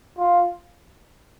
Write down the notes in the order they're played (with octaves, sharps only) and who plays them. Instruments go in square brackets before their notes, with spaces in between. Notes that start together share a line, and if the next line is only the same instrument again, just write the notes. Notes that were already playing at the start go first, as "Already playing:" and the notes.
[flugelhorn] F4